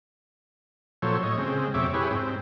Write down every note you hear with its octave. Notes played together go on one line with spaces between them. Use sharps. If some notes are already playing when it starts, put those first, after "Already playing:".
A#2 F3 F#3 A4 C5 C#5
A2 C#5 D#5
C#3 G#3 C4
F2 B2 C4 C#5 E5 D6
E4 G4 G#4 B4 C#5
G#2 C4